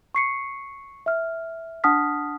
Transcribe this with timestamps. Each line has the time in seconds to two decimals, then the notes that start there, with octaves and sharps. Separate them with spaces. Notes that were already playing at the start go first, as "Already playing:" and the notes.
0.15 C#6 C7 C#7
1.06 E5 F6
1.84 D4 F#5 A5 D#6 F6 B6